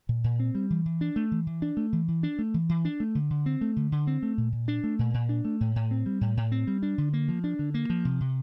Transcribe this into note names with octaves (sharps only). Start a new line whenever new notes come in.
A#2
A#2
C4
G3
E3
E3
D4
A3
E3
E3
D4
A3
E3
E3
D4
A3
E3
E3
D4
A3
D3
D3
C4
A3
D3
D3
C4
A3
A#2
A#2
D4
A3
A#2
A#2
D4
A3
A2
A2
C4
G3
A2
A2
C4
G3
D4
D3
A#3
F3
D4
D3
A#3
F3
C3
C3